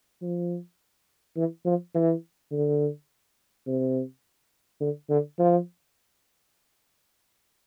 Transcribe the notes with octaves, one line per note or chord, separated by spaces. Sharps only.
F3
E3
F3
E3
D3
C3
D3
D3
F3